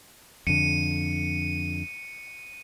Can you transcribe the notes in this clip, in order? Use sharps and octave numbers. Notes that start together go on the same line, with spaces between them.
F2 D3 C#7 D#7